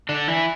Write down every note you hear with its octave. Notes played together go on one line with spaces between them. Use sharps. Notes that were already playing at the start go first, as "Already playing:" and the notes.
D3 D4
E3 E4